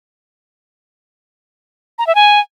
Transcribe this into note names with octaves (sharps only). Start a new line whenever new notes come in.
A#5
E5
G#5